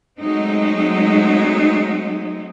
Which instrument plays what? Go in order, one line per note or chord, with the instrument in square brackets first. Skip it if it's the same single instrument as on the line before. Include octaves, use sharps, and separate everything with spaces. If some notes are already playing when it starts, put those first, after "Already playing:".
[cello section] F#3 G#3 A3 C4 D#4